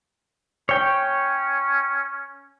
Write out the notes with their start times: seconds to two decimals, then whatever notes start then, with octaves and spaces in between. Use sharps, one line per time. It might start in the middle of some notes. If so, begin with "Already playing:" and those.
0.69 C#4 C#5 G5